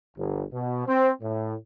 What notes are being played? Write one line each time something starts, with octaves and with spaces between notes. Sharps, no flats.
G1
B2
C4
A2